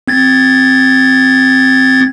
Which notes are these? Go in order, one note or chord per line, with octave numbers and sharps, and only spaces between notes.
C4 G#6 A6